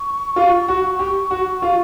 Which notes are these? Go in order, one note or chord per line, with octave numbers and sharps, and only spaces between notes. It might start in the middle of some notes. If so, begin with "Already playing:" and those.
Already playing: C#6
F4
F#4
G4
F#4
F4